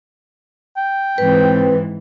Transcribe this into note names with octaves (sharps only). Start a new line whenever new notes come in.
G5
G#2 E3 C4 B4